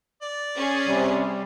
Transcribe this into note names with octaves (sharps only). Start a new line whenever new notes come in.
D5
C#4 G#4
C3 G3